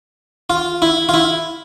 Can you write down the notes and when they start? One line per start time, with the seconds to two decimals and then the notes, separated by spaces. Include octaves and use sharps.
0.50 F4
0.82 E4
1.09 F4
1.14 E4